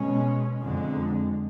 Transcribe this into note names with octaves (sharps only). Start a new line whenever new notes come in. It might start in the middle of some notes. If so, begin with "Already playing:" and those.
Already playing: B2 G#3 C#4
F2 D3 G#3